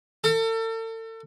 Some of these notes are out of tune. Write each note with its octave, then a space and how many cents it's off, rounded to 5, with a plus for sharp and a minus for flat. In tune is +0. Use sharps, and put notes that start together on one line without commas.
A4 +40